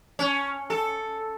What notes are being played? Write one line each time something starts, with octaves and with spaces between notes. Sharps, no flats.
C#4
A4